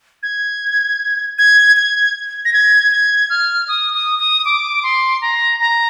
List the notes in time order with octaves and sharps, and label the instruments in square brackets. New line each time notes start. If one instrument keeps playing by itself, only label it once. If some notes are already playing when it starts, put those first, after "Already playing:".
[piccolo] G#6
G#6
G#6
A#6
G#6
G#6
F6
D#6
D#6
D#6
D6
C6
A#5
A#5